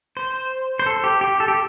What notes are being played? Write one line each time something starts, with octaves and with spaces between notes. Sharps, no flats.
C5
C5
A4
G4
G4
A4
G4